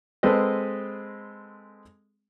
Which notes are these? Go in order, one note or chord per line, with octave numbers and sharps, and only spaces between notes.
G#3 C4 A4 B4 D#5